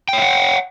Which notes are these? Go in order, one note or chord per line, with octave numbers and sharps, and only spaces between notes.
C#5 E5 F#5 G5